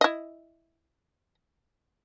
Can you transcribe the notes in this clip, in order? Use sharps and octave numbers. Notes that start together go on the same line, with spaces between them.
E4 D#5